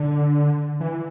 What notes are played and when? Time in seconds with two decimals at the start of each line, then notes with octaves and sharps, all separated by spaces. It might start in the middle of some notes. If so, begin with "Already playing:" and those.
Already playing: D3
0.80 E3